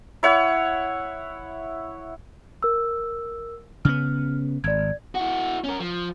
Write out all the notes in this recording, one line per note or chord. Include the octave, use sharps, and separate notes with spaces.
E4 C#5 F#5
A#4 E6
C#3 B3 F6
G#1 D5 G#6
E4 F#4
C#4 A#4
F3